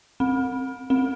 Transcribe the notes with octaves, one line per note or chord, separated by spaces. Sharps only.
C4
C4